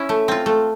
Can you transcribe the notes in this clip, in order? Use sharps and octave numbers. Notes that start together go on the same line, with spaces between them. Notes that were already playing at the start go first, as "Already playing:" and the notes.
Already playing: C#4 E4
A3
C4 F4
A3